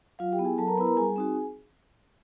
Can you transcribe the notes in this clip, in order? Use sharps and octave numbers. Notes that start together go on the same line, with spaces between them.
F#3 F4 F5
G4 G5
B3 E4
G#4 G#5
F#3 A4 A5
A#4 A#5
B3 E4 B4 B5
A#4 A#5
G3 G#4 G#5
C4 D#4 F#4